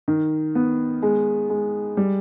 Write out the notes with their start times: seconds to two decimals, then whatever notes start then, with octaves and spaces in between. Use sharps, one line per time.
0.08 D#3
0.55 B3
1.02 G#3
1.50 G#3
1.97 G3